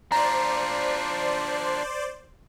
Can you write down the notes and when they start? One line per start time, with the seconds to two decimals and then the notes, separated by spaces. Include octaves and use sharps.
0.12 D4 F4 C5 D5 A#5